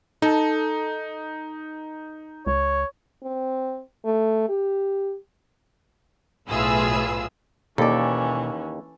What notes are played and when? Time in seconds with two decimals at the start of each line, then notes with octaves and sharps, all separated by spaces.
0.22 D#4 A4
2.47 C#2 C#5
3.23 C4
4.05 A3
4.49 G4
6.49 B1 A2 F4 G#4 B4 E6
7.78 D#2 B2 E3 A#3 C#4 A4 D5